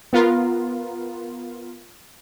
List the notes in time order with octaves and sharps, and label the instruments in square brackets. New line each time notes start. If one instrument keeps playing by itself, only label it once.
[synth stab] B3 F4 A#4